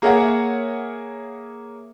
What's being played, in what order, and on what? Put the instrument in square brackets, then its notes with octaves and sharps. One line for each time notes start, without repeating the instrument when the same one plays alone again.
[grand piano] A#3 G#4 A#4 C#5 E5 F#5